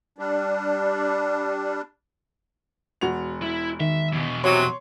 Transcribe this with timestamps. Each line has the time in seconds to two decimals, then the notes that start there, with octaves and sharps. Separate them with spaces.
0.18 G3 D4
3.01 E1 F#4 F7
3.42 E4
3.80 D#3 E5
4.13 E2 B2
4.44 C3 F#3 C#5 C6